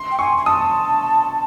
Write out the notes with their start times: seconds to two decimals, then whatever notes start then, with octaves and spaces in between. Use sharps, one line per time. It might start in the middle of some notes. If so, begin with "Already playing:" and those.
Already playing: C6
0.11 G5
0.19 G#5 C#6
0.37 G#5
0.45 A5 D#6